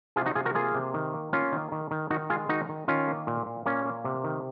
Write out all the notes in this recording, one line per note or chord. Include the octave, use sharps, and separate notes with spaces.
C3 F4 G#4
D#4 F#4
C3 F4 G#4
F#4 A#4
A#3 F4 G#4
C3
D#3
A#3
A#3 C#4 F4
D#3
D#3
D#3
D#3 D#4 F#4
G#3 F4 G#4
D#3 D#4 F#4
D#3
D#3 C#4 F4
A#3
A#2
A#2
A#2 A#3 C#4
A#3
C3
D#3